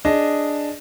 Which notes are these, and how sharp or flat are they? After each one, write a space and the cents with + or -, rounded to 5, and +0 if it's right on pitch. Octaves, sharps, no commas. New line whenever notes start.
D4 +0 G#4 +0 D#5 +0